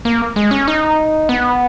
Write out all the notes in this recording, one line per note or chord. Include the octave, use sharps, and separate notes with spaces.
A#3
G#3
C#4
D#4
B3